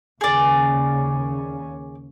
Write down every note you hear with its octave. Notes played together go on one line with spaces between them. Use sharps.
D#2 C#3 C#4 G#4 D5